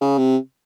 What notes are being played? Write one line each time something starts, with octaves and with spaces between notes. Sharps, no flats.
C#3
C3